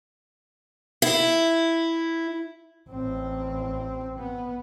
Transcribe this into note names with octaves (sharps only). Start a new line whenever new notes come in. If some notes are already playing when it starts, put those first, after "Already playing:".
E4
A1 C4
B3